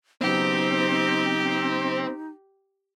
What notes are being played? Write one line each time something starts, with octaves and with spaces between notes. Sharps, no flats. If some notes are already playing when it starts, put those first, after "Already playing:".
C#3 F#3 B3 C4 D#4 G4